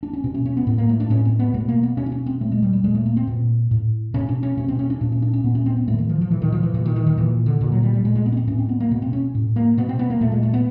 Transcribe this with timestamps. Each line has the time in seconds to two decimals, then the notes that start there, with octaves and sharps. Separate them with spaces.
0.03 D4
0.13 C#4
0.24 B2 C4
0.34 C#4
0.46 C#4
0.57 B3
0.67 A2 B3
0.78 A#3
0.89 A3
1.00 D4
1.10 A2 C#4
1.25 C4
1.39 B3
1.54 B2 A3
1.68 A#3
1.83 B3
1.97 B2 C#4
2.06 D4
2.12 C#4
2.26 C4
2.41 A#2 A3
2.52 G#3
2.62 G3
2.73 G3
2.84 A#2 G#3
2.95 A3
3.06 A#3
3.17 C4
3.27 A#2
3.71 A2
4.14 B2 C#4
4.29 D4
4.43 C#4
4.57 B2 C#4
4.68 C4
4.79 C#4
4.90 D4
5.01 A#2 D4
5.12 C#4
5.22 D4
5.33 C#4
5.44 A#2 B3
5.55 C#4
5.66 C4
5.77 B3
5.87 A2 A3
5.94 E3
5.98 D#3
6.09 F3
6.21 F3
6.31 A#2 E3
6.42 D#3
6.52 F3
6.63 E3
6.74 A#2 E3
6.85 D#3
6.96 D#3
7.07 D#3
7.18 A#2 E3
7.46 D3
7.61 A#2 D3
7.72 F#3
7.83 G3
7.93 G3
8.04 A#2 G#3
8.15 G#3
8.26 B3
8.32 C#4
8.37 C4
8.47 A2 C#4
8.59 C4
8.69 B3
8.80 A#3
8.91 B2 B3
9.02 C4
9.13 C#4
9.35 A2
9.56 A#3
9.77 B2 B3
9.89 C4
9.99 B3
10.10 A#3
10.21 A#2 A3
10.32 G#3
10.43 A3
10.53 B3